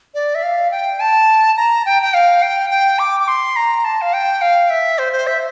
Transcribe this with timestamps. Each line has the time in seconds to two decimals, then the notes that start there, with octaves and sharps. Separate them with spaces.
0.14 D5
0.35 E5
0.43 F5
0.71 G5
1.00 A5
1.57 A#5
1.86 G5
2.02 G5
2.14 F5
2.42 G5
2.70 G5
2.99 D6
3.20 D6
3.28 C6
3.56 A#5
3.84 A5
4.01 F5
4.13 G5
4.41 F5
4.70 E5
4.98 C5
5.13 C5
5.27 E5